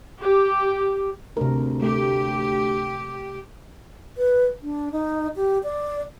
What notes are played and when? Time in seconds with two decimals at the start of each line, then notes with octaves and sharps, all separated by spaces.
0.20 G4
1.37 D2 C3 A#4
1.82 A3 G4
4.17 B4
4.62 D4
4.92 D#4
5.36 G4
5.64 D5